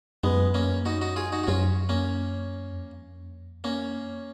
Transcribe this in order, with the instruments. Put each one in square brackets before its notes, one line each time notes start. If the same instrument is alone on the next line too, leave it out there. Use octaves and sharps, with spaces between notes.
[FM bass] F#2 [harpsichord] G#3 B3
[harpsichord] A#3 C#4
D#4 F#4
D#4 F#4
F4 G#4
D#4 F#4
F#4
[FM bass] F#2 [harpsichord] C#4 F4
[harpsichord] A#3 C#4
[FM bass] F2
[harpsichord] A#3 C#4
[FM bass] F#2